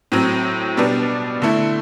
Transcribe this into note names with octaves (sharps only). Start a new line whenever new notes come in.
A2 F#3 C4
B2 G3 B3 D4
D3 A3 E4